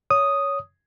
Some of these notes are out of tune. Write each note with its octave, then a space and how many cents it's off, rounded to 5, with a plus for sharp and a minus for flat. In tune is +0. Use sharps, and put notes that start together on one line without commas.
C#5 +15 D#6 +0